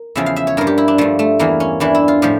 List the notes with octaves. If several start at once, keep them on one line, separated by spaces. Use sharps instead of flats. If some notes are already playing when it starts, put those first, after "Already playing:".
Already playing: A#4
E2 C#3 F3 E5
F5
E5
C#5
G2 F3 A#4
G4
E4
D4
G2 F3 A3
A3
E2 E3 A#3
C#4
E2 E3 D4
E4
F4
A2 F3 G4